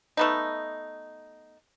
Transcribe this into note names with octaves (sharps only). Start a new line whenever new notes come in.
A3 B3 D#4